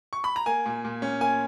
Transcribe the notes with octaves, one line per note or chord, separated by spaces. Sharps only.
C#6
B5
A#5
A#3 G#5
A#2
A#2
C#4
A#3 G#5